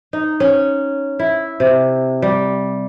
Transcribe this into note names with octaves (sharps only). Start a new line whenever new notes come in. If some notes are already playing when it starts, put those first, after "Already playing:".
D#4
C#4
E4
C3
G3